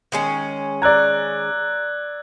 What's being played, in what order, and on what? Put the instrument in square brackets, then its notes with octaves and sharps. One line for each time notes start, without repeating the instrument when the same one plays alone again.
[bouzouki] D#3 G#3 C#4
[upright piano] D5 A#5 [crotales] E6 F#6 G#6